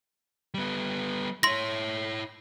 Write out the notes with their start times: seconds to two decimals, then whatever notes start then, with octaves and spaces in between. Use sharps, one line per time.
0.54 G3 B3
1.43 E4 C#5 C6 A#6